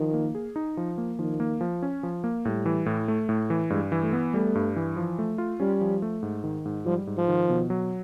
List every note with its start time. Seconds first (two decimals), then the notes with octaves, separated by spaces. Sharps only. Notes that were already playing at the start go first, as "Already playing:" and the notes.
Already playing: D#3 F3
0.14 A#3
0.35 G#4
0.56 D#4
0.77 F3
0.98 A#3
1.19 D#3 F3
1.40 A#3
1.61 F3
1.82 C#4
2.03 F3
2.24 A#3
2.45 A2 G3
2.66 E3
2.86 A2
3.08 A3
3.29 A2
3.50 E3
3.70 G2 G#3
3.92 E3
4.03 A3
4.13 B3
4.34 G3 A3
4.55 G2
4.76 E3
4.96 F3
5.19 A3
5.38 F4
5.60 G3 C#4
5.81 F3
6.02 A3
6.23 G#2
6.44 D#3
6.65 G#2
6.86 F3 G3
7.07 G#2
7.17 F3
7.28 D#3
7.50 B2
7.70 F#3